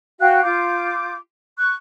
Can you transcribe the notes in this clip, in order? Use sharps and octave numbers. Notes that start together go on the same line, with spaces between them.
F#4 F5 G5 F#6
F4 D6 G6
C#6 F#6